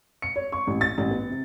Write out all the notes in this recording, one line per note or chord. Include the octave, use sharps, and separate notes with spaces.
C#7
C#5
C#6
A1
A6
A1
B3
C3